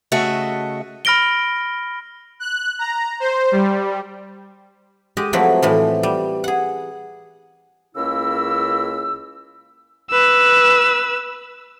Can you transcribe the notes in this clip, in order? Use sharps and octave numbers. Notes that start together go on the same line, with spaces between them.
C#3 A3 F#4 D#5 E5
B5 F6 A#6 D7 G7
F#6
A#5
C5
G3
G#3 G4 D#5
F3 F#3 A3 C4 E4 B4
A2 E3 F3
G3
G#4 F#5
C#2 C#3 A#3 E4 A#4 E6
B4 E6